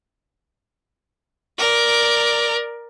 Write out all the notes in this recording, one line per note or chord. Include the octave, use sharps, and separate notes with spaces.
A#4 D5